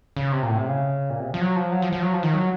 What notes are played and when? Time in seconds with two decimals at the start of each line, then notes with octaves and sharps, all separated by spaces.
0.17 C#3
0.32 C3
0.43 A#2
0.48 A2
0.58 C3
0.68 C#3
1.10 A#2
1.20 C3
1.34 F3
1.41 F#3
1.56 F3
1.72 F#3
1.82 F3
1.93 F3
2.02 F#3
2.13 F3
2.23 D#3
2.33 F#3